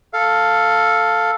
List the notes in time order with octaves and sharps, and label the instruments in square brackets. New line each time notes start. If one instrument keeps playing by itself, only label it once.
[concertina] A4 F5